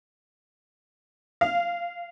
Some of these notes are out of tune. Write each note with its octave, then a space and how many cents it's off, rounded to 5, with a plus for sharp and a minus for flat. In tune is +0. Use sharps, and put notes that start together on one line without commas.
F5 -15